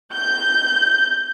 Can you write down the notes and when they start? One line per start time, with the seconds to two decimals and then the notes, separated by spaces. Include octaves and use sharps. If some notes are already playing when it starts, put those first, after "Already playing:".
0.13 G6